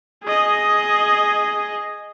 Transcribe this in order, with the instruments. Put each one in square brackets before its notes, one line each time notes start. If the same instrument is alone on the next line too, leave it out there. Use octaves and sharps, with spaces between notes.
[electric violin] G#4 D#5